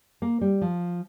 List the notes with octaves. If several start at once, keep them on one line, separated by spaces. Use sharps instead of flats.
A#3
G3
F3